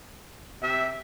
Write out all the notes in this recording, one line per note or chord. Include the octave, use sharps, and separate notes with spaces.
C3 E5